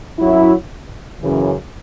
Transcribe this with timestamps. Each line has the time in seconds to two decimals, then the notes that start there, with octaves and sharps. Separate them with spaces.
0.19 F#2 F#3 E4
1.20 F#2 C#3 E3